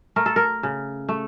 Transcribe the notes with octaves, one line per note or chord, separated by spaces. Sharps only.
A3 A#4
A4
A#4
C#3
A3